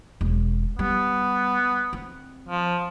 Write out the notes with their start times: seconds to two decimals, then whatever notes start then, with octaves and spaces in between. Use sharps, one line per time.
0.21 E1
0.79 G3 B3
1.93 C4
2.49 F3